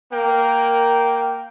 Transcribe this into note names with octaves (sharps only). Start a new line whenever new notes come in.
A#3 A#4 G5